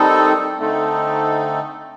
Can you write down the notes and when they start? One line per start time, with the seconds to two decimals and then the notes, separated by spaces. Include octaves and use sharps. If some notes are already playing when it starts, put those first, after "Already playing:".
Already playing: D#3 G3 C4 D#4 A4
0.58 D3 A3 C4 D#4 A4